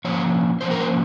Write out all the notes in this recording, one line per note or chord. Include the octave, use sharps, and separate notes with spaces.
F3 A#3 C#4 C#5
F3 A#3 C#4 C5
A#4
C5